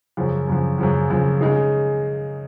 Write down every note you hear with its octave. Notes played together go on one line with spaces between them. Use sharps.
F#2 C#3 F3
F#2 C#3 F3
F#2 C#3 F3
F#2 C#3 F3
C#3 G#3 D#4 G#4